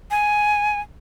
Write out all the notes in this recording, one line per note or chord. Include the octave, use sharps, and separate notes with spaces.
G#5